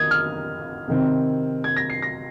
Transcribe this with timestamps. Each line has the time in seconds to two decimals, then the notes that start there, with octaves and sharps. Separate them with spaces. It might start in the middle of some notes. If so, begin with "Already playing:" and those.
Already playing: D#3 D#6 G#6
0.11 F6
0.88 C3 D#3 C4
1.64 G#6
1.77 A#6
1.90 C7
2.02 A#6